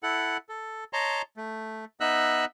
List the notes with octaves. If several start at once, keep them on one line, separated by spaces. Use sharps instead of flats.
E4 A4 F#5
A4
C#5 D#5 A5 A#5 C6
A3
B3 D#4 D#5 E5 E6 F#6